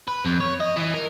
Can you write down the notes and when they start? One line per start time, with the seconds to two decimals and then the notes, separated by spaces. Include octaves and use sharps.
0.08 B4
0.25 F2
0.41 C#5
0.60 D#5
0.76 E3
0.94 A#4